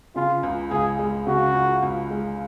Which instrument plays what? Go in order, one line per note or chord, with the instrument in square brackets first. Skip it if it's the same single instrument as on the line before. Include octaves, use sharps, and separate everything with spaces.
[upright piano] C#3 [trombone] F4
[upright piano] C#2
[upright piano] C#2 [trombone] G#4
[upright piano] G#3
[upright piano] C#3 [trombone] F#4
[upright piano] C#2
C#2
G#3